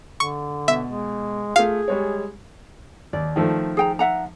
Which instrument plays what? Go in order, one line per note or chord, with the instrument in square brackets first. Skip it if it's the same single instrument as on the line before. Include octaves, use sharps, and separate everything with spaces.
[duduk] D3 [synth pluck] C#6
[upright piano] B2 [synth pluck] E5
[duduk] G#3
[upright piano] A3 F4 [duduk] G#4 [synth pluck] F5
[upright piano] G3 G#3 C#5
[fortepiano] D#2 [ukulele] D5
[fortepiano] D#3 F3 A3
[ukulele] G#4 G5 A#5
E5 F#5 A#5